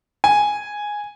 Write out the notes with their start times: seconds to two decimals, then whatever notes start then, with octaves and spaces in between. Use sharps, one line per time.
0.24 G#5